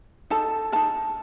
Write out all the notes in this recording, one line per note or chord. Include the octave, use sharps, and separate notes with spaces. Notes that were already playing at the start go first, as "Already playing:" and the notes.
D#4 A4 A5
D#4 A#4 A5